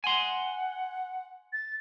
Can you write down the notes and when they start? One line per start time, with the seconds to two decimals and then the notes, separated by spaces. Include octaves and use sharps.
0.04 F#5 G#5 C6
1.53 A6